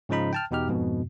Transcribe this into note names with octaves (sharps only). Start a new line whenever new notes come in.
G#2 C#3 F3 D#4 B5
G5 A5 F6
E2 B2 D#4 G4 F6
F2 G#2 B2